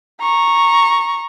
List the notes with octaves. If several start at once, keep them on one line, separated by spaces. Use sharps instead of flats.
A#5 C#6